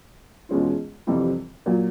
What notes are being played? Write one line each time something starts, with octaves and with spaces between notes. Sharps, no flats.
E2 B2 G#3 C#4 F4
F2 C3 E3 G3 C4
A#2 F#3